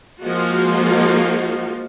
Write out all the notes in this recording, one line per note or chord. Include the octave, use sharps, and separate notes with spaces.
F3 G#3 A#3 D#4 F4 F#4